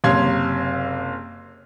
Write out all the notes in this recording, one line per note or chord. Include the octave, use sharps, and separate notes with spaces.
F#1 C3 C#4 F5 C6 G#6